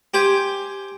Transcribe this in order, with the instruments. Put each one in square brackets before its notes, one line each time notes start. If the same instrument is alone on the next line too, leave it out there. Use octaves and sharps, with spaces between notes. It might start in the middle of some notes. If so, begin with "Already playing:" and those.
[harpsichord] G4 C5 G5 G#5